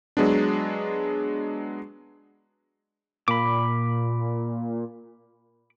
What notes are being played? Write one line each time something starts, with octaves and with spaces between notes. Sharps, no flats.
F#3 G#3 B3 D4
A#2 B5 D6